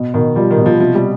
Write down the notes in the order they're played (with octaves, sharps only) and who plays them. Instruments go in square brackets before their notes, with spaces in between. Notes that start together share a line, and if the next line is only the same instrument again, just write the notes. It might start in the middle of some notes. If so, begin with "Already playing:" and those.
Already playing: [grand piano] B2
[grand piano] B2 [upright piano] D#3
[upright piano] F3 [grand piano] G3
[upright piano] D#3
[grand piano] B2
[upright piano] F3
[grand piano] C3 [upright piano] F3
[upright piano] G3